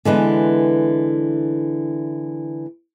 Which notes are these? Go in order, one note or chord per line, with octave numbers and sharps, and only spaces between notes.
D3 E3 G#3 B3